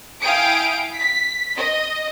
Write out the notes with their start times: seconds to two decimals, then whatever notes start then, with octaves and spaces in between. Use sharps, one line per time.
0.21 E4 F5 G5 G#5 D#6 D7
1.00 B6
1.56 D#5